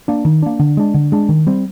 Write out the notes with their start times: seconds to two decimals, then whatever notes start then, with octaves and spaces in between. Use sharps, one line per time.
0.08 A#3 D4
0.25 D#3
0.42 A#3 D4
0.59 D3
0.77 G#3 D4
0.94 D3
1.12 G#3 D4
1.29 D#3
1.47 G3 C4